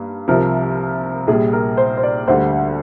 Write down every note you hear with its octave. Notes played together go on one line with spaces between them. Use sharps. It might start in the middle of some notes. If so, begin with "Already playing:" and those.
Already playing: G2 A#3
C2 C3 F3 C4 A#4
A#1 A#2 G3 G#4
A#4
C5
C5
D5
D2 D3 G3 C5